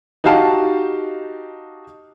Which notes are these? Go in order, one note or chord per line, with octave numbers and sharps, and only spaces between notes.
D#4 F#4 G4 F5 A5